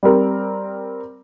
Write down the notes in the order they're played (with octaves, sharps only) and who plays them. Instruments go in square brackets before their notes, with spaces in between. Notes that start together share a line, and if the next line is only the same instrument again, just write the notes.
[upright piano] G3 C4 A#4